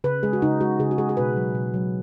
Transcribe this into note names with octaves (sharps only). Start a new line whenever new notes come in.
C#3 B4
G#3 G#4
F#4
C#3 D#4
G#3 F#4
C#3 G#4
F#4
G#3 G#4
G#4
B2 B4
F#3
B2
F#3